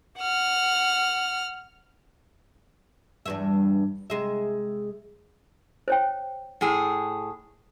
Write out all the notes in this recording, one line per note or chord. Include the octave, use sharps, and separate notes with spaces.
F#5 F6
E2 G2 E5
C3 G#3 E5
C5 C#5 G5
A2 G#4